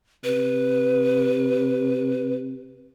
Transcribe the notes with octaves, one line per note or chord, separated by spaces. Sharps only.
C3 B4